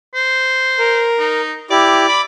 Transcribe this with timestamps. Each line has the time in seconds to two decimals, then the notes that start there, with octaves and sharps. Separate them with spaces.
0.15 C5
0.79 A#4
1.19 D#4
1.71 E4 G4 D5
2.08 B5 D6